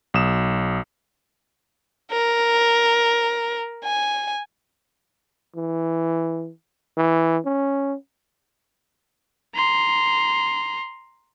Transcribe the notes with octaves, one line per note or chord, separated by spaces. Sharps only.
B1 D#6 E7
A#4
G#5
E3
E3
C#4
A#5 C6